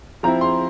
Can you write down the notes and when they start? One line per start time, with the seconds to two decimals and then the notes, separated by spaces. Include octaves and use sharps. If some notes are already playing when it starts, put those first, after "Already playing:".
0.23 F3 C4 E4 A#5
0.41 C6